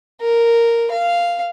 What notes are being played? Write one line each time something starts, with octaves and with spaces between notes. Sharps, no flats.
A#4
F5